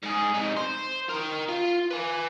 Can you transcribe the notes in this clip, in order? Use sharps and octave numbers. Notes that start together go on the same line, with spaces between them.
G#2 G#4
C3 D#4
C5
A#4 G5
F4
B4 G#5